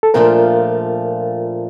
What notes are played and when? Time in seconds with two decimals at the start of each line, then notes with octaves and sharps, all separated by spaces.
0.03 A4
0.14 A#2 F3 A3 D4 F4 A#4